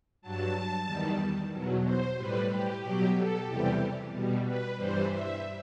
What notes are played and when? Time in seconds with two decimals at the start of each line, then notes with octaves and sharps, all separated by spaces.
0.22 G2 F#3 A5
0.86 E2 D#3 G3
1.52 E2 B2 F#3
1.84 C5
2.16 A2 G3 B4
2.49 G4
2.81 B2 F#3 G4
3.15 A4
3.46 E2 C3 E3 G3 G4
4.11 B2 G3
4.44 B4
4.77 G2 E3 G3 C5
5.09 E5